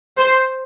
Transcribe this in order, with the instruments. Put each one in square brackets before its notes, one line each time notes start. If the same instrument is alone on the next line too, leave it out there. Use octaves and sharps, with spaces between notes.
[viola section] C5